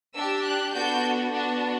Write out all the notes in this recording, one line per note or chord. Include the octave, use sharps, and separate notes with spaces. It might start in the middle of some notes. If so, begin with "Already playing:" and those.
D4 G4 E6
F#6
B3 D4 F#4 A4 G6
B3 D4 F#4